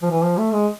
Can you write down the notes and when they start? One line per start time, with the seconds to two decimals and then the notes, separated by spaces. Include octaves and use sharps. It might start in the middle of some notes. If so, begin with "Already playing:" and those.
0.02 F3
0.10 E3
0.24 F3
0.38 A3
0.52 G#3